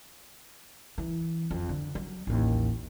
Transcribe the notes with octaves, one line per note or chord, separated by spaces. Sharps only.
E3
F2
D3
F#3
A1 D#2